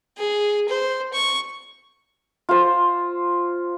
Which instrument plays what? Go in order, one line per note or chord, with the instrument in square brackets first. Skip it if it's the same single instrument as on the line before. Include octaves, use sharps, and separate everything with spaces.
[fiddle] G#4
C5
C#6
[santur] F4 C5